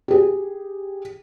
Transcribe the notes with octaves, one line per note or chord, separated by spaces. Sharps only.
G4 G#4